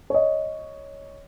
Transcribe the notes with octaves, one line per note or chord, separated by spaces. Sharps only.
C#5 D#5